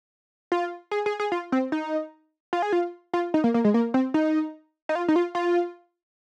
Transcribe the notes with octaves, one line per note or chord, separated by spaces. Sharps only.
F4
G#4
G#4
G#4
F4
C4
D#4
F4
G#4
F4
F4
D#4
A#3
A#3
G#3
A#3
C4
D#4
D#4
F4
D#4
F4
F4